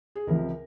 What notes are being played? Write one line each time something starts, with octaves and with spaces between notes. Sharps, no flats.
G#4
C#2 C3 F3 A#4